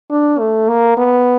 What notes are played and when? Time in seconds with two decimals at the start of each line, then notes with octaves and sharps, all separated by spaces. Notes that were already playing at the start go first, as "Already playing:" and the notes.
0.11 D4
0.39 A3
0.69 A#3
0.97 B3